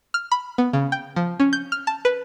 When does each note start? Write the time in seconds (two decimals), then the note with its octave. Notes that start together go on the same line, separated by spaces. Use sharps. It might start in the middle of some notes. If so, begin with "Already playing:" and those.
0.14 F6
0.31 B5
0.58 B3
0.73 C#3
0.92 G5
1.16 F3
1.40 C#4
1.53 G6
1.72 F6
1.87 A5
2.05 B4